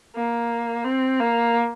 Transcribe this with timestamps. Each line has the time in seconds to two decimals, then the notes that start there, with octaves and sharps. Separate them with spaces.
0.15 A#3
0.85 C4
1.20 A#3